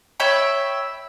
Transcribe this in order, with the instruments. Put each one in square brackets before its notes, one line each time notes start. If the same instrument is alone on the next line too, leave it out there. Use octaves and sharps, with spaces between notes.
[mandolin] C#5 E5 G5 B5